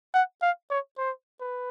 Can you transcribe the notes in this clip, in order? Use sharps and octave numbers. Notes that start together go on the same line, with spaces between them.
F#5
F5
C#5
C5
B4